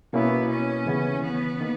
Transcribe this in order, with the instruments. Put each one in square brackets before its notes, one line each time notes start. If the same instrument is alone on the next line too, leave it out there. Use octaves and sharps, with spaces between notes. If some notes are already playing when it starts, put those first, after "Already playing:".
[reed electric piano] B2 A#3 C#4 E4 [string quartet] B3
[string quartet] C#4
[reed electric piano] D#2 C#3 E3 B3
[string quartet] B3
[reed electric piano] D#3 A#3